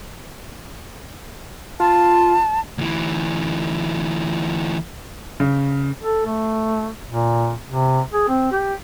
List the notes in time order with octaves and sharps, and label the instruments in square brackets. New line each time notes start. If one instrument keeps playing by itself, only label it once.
[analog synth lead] F4 [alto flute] A5
[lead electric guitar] D2 E3
[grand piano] C#3
[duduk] A4
A3
A#2
C3
G#4
C4
G4